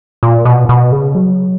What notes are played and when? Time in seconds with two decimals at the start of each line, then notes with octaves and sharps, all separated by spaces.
0.23 A#2
0.45 B2
0.69 B2
0.92 C#3
1.15 F#3